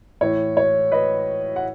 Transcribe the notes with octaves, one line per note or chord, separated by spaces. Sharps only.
A2 E3 C#5
C#5
B4 D#5
F#5